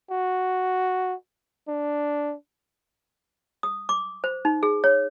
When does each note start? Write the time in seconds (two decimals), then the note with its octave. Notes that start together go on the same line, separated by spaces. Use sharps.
0.10 F#4
1.68 D4
3.63 D#6
3.89 D6
4.24 C5
4.45 D#4
4.63 G#4
4.84 C#5